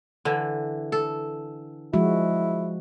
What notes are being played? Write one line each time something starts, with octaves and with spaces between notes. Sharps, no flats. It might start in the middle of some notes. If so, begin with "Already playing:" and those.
D3 E3
A4
F3 G#3 E4 F#4